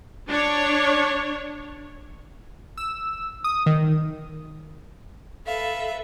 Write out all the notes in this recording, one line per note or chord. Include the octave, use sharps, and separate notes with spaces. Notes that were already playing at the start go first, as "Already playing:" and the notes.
D4 C#5
E6
D#6
D#3
A4 B4 E5 F5